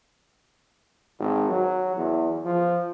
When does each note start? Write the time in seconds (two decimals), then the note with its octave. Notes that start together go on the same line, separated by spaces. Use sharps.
1.19 G#1
1.49 F#3
1.96 E2
2.45 F3